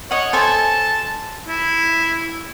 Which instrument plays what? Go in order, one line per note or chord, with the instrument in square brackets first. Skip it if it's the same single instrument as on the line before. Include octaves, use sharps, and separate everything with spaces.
[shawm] C#5 [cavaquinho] D#5 F#5
[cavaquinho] A4 C5 G#5 [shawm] A5
[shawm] E4